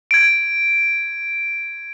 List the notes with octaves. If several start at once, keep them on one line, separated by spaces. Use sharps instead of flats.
G#6 D7